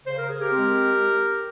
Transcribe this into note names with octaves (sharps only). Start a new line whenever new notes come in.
C#3 C5
A#4
G#4
G4 A#4
G#3 C4